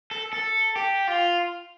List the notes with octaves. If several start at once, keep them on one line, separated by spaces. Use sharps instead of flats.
A4
A4
G4
F4